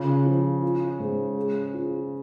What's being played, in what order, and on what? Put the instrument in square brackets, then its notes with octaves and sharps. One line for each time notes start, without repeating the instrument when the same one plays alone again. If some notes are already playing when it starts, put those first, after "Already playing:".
Already playing: [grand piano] C#3 [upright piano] F4
[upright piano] F3
F4
G#2
G#4
F4